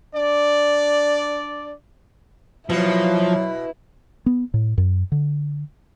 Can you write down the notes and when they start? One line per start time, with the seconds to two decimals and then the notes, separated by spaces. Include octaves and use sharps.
0.15 D4 D5
2.70 B2 F3 F#3 E4
4.26 B3
4.54 A2
4.78 F#2
5.12 D3